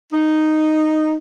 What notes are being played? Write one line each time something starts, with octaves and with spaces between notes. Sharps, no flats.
D#4